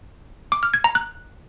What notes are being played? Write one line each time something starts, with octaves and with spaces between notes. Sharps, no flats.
D6
F6
G#6
A#5
F#6